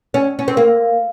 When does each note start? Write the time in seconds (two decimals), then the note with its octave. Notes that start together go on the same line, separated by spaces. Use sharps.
0.14 C#4
0.39 C#4
0.48 C4
0.57 A#3